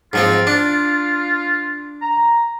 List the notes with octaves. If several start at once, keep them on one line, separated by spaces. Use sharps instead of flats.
G#2 F3 C4 F4
D4
A#5